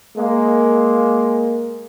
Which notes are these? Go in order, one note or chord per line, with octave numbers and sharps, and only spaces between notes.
G#3 A#3